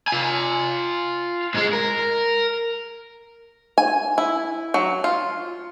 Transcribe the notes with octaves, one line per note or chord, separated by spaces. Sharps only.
F4 G#5
G#2 G#3
A#4
G#5
E4
F#3
F4